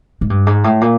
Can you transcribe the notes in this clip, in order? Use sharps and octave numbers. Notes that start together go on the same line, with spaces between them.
G#2
G2
G#2
A2
A#2